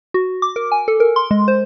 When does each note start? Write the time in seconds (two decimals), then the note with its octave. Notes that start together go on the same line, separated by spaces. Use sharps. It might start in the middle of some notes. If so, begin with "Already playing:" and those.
0.14 F#4
0.42 D6
0.56 A#4
0.72 G#5
0.88 A4
1.00 A#4
1.16 C6
1.31 G#3
1.48 C5